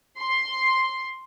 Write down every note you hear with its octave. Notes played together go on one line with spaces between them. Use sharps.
C6